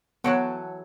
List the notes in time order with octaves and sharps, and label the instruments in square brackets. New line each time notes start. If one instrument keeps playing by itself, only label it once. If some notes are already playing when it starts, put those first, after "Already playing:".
[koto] E3 F#3 G5 [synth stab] B3 C#5 F#5 [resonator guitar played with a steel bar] A4